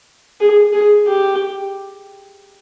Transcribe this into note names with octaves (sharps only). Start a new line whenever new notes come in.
G#4
G#4
G4